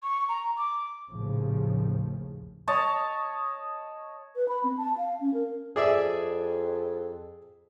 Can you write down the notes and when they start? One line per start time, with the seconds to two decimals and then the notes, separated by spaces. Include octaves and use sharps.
0.03 C#6
0.29 A#5
0.57 D6
1.09 A#1 D#2 A2 C#3 F3
2.68 C#5 D#5 A5
4.36 B4
4.48 B5
4.64 C4
4.77 A5
4.97 F5
5.21 C#4
5.34 A#4
5.76 F2 G#4 D5 E5